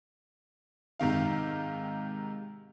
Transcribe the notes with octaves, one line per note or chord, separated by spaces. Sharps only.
G#2 C3 D#3 F5